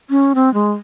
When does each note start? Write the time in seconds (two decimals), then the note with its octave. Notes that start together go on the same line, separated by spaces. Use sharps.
0.10 C#4
0.35 C4
0.54 G#3